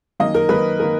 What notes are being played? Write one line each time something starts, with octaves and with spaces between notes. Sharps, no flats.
F#2 D#3 A#3 D#5
A#4
F#2 D#3 A#3 B4
D#3 A#3 A#4